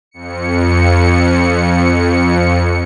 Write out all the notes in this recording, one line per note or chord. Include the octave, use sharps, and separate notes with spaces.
F2 C#7